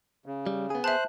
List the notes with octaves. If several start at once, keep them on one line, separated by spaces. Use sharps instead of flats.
C#3
G3
B3 G#4
C5 E5 A5 F#6